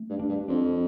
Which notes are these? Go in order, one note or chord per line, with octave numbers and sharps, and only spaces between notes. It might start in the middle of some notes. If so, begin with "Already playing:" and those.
Already playing: A3
G2
D4
G2
F2 D4